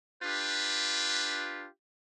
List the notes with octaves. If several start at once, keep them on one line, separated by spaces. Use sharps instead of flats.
D4 F4 G4 B4